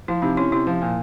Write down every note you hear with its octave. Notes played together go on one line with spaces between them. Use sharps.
F3 E4
C3 D#4
C#4 E4
C3 E4
F3
A#2